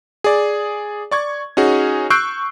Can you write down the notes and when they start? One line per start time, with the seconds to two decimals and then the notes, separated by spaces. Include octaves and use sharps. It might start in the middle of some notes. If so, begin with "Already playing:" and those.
0.24 G#4 D5
1.11 D5 C#6 G#6
1.57 C#4 D#4 F#4 G#4
2.10 C#6 E6 F#6 G6 C7 D7